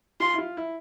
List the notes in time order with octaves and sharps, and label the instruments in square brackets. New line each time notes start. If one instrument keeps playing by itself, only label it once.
[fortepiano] F4 [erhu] C6
[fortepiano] E4
F4
E4